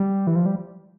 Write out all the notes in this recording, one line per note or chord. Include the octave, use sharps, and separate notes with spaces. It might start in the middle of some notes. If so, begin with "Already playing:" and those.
Already playing: G3
E3
F3
G3